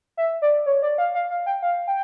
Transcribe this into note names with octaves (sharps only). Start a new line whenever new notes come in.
E5
D5
C#5
D5
F5
F5
F5
G5
F5
G5